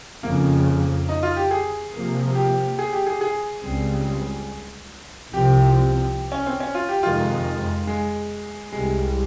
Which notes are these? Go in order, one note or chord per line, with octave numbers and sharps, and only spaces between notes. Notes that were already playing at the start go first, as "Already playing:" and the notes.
F2 C#3 F3 A#3
D#4
F4
G4
G#4
C3 F3 A#3
G4
G#4
G4
G#4
G#4
C#2 C#3 G3 C4
C2 C3 F3 C4 G4
C#4
C4
C#4
F4
G4
F2 C3 D#3 G#3 F4
G#3
C2 C3 G3 G#3